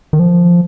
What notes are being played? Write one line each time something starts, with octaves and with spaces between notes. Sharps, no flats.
D#3
F3